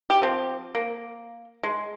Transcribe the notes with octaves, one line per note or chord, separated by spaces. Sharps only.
G4
F3 C4
A#3
G#3